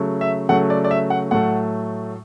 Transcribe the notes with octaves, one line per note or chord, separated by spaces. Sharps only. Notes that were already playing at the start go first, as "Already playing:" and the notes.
Already playing: C#3 F#3 A3
E5
C#3 F#3 A3 F#5
D5
D5
E5
F#5
A2 F#3 A3 F#5